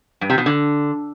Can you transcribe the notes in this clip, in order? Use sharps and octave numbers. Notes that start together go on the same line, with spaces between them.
G2
C3
B2
D3